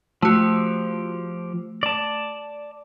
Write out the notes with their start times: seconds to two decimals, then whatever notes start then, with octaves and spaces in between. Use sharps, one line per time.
0.22 F3 A3 F#4 G4
1.83 D5 A5